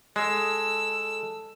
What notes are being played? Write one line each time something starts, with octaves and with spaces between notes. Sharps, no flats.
G#3 A4 E6